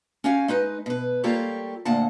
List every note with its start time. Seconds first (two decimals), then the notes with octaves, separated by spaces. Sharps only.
0.24 C#4 F#4 G4 F5 G#5
0.48 G#3 D#4 B4 D#5
0.86 B2 B4
1.24 G3 A#3 F4 G4 A4 C#5
1.85 D2 A#2 A#3 F#5 A5